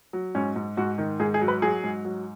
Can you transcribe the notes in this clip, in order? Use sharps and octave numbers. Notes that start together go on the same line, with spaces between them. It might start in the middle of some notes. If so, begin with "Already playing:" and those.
F#3
G#2 C#4
G#2
G#2 F#4
D#3
G#2 G#4
G#4
F#3
B4
F#3 G#4
G#2
F#3